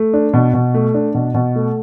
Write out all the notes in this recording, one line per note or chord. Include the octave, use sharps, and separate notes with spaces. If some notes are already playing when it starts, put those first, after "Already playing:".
Already playing: A3
D4
B2
B2
A3
D4
B2
B2
A3